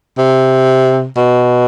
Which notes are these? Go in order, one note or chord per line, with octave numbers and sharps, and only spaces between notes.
C3
B2